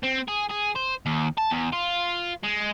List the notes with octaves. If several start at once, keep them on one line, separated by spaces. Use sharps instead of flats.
C4
G#4
G#4
C5
D#2
A5
E2
F4
G#3